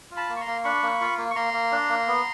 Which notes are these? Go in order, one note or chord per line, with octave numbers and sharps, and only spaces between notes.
F4
A5 B5
A#3
C#6
A#5 C6
A#3
D4 B5 C#6
A#3
F4
A#3
C#6
A#3 A#5 C6
A#3
D4
A#3
B3